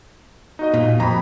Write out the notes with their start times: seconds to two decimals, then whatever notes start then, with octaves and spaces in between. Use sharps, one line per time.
0.59 D#4 F#4 D#5
0.74 A#2
1.00 F2 A#5 B5